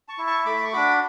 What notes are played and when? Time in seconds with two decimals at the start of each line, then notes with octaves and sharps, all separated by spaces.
0.08 A5 C#6
0.18 E4
0.27 A5 C#6
0.45 A3 B5 D6
0.65 C#6
0.73 D4 F#4 B5 D6